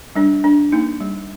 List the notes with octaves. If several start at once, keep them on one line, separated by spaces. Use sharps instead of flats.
G3 D4
D4
A#3 D#4
G3